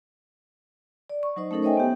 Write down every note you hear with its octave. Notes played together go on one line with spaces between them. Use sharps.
D5
C#6
F#3 D#4 C5 D#5
A3 C#4 D#4 A4 A#4
C5 C#5 D#5 E5 G5 G#5
B3 G4